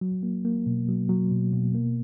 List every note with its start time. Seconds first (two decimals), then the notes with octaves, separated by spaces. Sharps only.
0.01 F#3
0.23 A#3
0.45 A#3
0.67 B2
0.88 F#3
1.09 F#3
1.32 B2
1.53 B2
1.75 A#3